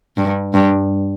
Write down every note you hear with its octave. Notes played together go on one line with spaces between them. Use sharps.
G2
G2